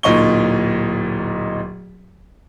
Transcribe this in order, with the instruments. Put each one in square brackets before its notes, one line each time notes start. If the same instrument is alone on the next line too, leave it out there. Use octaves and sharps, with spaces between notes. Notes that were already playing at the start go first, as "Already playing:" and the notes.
[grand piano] D1 A#2 D#4 C#6 G7